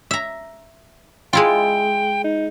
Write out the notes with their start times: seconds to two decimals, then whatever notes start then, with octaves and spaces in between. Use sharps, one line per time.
0.11 E5 A#5
1.33 G#3 E4 F4 G5
2.24 D#4